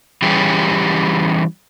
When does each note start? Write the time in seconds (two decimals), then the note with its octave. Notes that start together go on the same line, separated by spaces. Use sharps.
0.22 E3 G3 C#4 G4 G#4